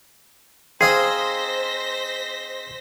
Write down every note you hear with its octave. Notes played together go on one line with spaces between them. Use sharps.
C4 D#4 G#4 C5 F5 A#6 B6